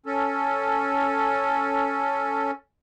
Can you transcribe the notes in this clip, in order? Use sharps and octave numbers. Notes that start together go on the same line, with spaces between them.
C#4 A4